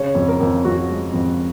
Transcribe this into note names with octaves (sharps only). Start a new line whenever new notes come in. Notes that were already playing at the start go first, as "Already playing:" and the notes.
Already playing: C#3 C#5
F2
A#4
F2
F2 F#4
G#3
F2